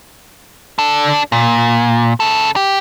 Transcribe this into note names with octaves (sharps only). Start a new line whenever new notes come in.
D4 A4
A#2
C#3 A4
G4